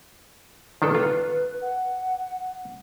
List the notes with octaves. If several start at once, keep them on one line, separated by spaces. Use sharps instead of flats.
D#3 D4 A4 B4
F4
F#5